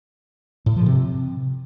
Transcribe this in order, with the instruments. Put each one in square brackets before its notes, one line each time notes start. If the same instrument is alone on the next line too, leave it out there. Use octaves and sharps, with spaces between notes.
[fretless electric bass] A2
F3
C3